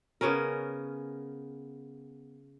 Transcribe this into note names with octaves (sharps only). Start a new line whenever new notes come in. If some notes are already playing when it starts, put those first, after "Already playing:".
C#3 B3 C#4 A#4